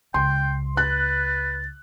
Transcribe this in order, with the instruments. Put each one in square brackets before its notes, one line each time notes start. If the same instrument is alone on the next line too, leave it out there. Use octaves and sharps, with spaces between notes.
[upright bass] C#2 [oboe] G5 [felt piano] C6
[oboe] B4 [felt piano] F#6 [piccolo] A6